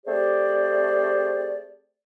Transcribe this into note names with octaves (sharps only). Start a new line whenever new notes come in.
A3 C4 G4 G#4 C5 D5